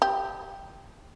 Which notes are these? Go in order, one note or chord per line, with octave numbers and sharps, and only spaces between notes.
G4